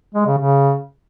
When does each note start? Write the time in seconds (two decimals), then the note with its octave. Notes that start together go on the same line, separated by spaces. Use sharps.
0.14 G#3
0.26 C#3
0.38 C#3